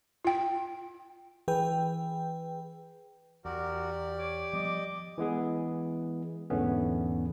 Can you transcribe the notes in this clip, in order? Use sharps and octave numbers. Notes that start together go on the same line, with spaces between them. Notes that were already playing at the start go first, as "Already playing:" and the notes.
F4 G5
E3 G#4 B4 G5
E2 F#4 G4 A#4 D5
C#5 D6
F3 G3 B3 D#5
E3 G#3 B3 G#4
E2 G#2 D3 A3 B3 C#4